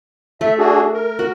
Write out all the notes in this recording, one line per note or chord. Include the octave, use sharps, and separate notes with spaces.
A3 E5
D4 F#4 G#4
A#4
F#4